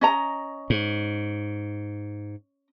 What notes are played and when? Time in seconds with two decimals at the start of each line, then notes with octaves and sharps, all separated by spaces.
0.01 C#4 D#5 A#5
0.70 G#2